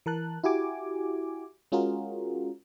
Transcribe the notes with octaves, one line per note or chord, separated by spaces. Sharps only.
E3 A#4 A5 F#6
E4 F#4 G4 G#5 D6
G#3 C#4 F4 F#4 G#4 A#4